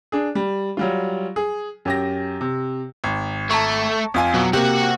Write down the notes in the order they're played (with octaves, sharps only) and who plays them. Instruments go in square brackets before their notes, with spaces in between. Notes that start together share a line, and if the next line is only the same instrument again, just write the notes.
[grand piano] D4 G#4
G3
F#3 G3 F4
G#4
F#2 G4 A#6
C3
G#1
[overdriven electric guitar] A3 [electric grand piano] A5 A#5 C#6
[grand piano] F2 F4 G#5
[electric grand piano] B2 [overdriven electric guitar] F#3
[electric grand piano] C3 A#3 [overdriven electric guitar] F#4 F#5 [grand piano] G4